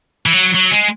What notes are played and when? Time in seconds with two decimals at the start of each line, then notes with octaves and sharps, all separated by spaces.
0.26 E3
0.33 F#3
0.54 F#3
0.71 G#3